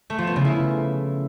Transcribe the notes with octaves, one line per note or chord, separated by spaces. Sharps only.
A3
F3
B3
C#3
E4